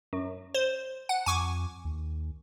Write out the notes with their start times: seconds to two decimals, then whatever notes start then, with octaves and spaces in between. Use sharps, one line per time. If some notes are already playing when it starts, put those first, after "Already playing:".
0.13 F#2
0.54 C5
1.09 F#5
1.26 F2 G#5 C#6 D6
1.84 D#2